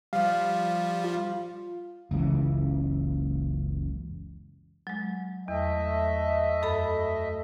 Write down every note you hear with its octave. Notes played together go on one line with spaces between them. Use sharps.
F3 G3 F5
F4
F#1 C#2 C#3 E3
F#3 G#3
E2 A3 D#5 E5
F#2 A4 B5